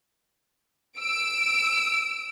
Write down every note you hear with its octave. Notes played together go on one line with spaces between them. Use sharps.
E6 D7